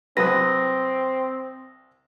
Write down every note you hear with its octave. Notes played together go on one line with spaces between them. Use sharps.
C2 F#3 C4 B4 D#6 A#6